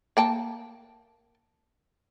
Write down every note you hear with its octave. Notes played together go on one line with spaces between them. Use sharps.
A#3 G5 A5